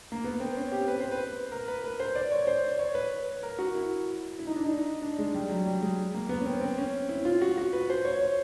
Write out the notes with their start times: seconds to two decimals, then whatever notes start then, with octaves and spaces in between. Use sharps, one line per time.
0.12 A#3
0.24 B3
0.40 C4
0.57 C#4
0.72 G4
0.88 B4
1.00 C5
1.12 B4
1.52 A#4
1.68 B4
1.84 B4
2.00 C5
2.15 D5
2.32 C#5
2.47 C5
2.63 D5
2.79 C#5
2.95 B4
3.43 A#4
3.59 F#4
3.75 E4
4.39 E4
4.47 D#4
4.56 D4
4.64 D#4
5.02 D4
5.19 G#3
5.34 G3
5.49 F#3
5.66 G3
5.81 G#3
6.14 A#3
6.29 B3
6.41 C#4
6.46 C4
6.61 C4
6.78 C#4
7.09 E4
7.25 F4
7.41 F#4
7.58 F#4
7.73 B4
7.90 C5
8.05 C#5
8.21 C#5